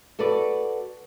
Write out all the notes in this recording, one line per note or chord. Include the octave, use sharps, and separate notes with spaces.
F#4 A4 B4 D5